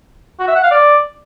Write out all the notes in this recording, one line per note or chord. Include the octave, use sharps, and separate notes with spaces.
F#4
E5
F#5
F5
D5